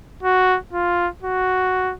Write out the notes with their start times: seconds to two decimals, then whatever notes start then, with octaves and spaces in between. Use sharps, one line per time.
0.23 F#4
0.73 F4
1.23 F#4